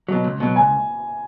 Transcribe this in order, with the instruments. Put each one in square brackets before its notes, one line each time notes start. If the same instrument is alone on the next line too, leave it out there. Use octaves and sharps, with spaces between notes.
[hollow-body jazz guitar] B2 F#3
C#2
B2 F#3
[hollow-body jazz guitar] C#2 [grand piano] G#5